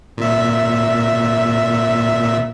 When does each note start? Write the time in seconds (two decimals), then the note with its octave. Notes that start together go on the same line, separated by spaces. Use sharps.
0.18 A#2 E5